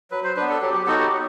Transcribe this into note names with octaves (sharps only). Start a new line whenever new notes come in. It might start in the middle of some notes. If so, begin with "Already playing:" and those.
F#3 B4
C5
B3 D4 B4
A4
F#3 G4
G4
B3 D#4 F#4 A4
G4
F#3